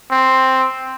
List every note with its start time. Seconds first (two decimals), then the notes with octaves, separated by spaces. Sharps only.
0.11 C4